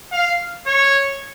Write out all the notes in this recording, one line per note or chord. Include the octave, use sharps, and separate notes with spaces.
F5
C#5